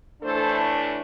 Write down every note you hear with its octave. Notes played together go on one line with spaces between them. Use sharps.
A2 E3 A3 D4 A4 C5